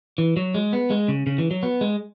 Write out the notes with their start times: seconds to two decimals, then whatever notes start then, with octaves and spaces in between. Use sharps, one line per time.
0.18 E3
0.37 F#3
0.54 G#3
0.73 B3
0.90 G#3
1.08 C#3
1.27 C#3
1.38 E3
1.51 F#3
1.63 B3
1.81 G#3